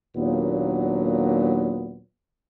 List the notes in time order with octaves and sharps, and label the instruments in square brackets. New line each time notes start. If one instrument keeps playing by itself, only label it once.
[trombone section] D#2 A#2 F#3 B3 D4